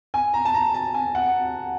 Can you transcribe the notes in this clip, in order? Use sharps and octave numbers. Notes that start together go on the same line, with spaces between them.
G#5
A#5
A5
A#5
A5
G#5
F#5